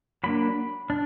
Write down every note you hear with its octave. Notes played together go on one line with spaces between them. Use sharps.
F#3 A#3 D4 B5
D4